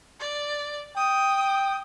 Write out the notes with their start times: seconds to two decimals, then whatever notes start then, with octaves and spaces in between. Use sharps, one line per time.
0.20 D5
0.97 G5 D#6